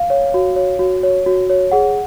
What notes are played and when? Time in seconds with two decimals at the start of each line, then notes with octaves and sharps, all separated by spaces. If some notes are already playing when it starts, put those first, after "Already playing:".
Already playing: F5
0.10 C#5
0.34 F#4
0.56 C#5
0.79 F#4
1.03 C#5
1.26 F#4
1.50 C#5
1.71 G#4 F#5